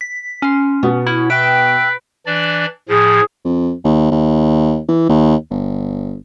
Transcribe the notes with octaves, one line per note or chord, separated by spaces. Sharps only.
B6
B3 C#4 C6
B2 B3 F#4 D#6
C#4 E4 F#5 B5
B4 E5 G5 D7
E3 D4 D5
A2 F3 G#4
F2
D#2
D#2
E3
D#2
G1